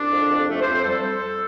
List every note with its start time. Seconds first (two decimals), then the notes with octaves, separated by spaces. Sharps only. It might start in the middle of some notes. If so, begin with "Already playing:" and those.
Already playing: C2 D4
0.11 F2
0.30 F2
0.48 F2 A3
0.60 C5
0.66 F2
0.72 C5
0.83 G3 A4